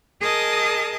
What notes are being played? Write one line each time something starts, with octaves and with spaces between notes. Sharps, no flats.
G#4 A#4 D#5 A5 D#6